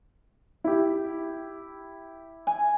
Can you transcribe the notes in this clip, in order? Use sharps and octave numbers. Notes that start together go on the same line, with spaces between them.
E4 G4
G#5